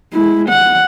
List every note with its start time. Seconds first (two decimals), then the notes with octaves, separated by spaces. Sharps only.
0.13 G#3 E4
0.49 F#5